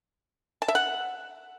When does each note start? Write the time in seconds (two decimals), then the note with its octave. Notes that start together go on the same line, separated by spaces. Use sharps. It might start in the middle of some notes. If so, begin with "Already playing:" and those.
0.62 A5
0.68 E5
0.75 F#5